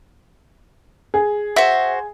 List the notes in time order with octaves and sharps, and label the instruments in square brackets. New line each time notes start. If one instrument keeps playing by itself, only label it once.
[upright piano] G#4
[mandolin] F#4 C5 [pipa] E5